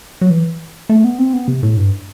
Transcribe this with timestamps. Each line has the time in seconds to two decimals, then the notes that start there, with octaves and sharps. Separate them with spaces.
0.21 F#3
0.30 E3
0.89 A3
1.04 B3
1.19 C4
1.33 B3
1.48 C3
1.63 A2
1.77 G2